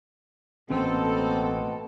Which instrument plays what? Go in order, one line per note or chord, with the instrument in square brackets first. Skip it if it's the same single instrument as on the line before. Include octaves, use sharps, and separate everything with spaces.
[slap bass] A1 C#4 [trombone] B2 [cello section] A#3 A4 [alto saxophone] C4